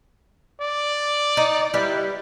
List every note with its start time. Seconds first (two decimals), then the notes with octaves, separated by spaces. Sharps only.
0.60 D5
1.37 D#4
1.74 G3 E4 B4